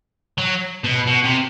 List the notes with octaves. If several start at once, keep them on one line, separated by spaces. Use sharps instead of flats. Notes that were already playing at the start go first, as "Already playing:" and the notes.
F#3
B2
B2
C3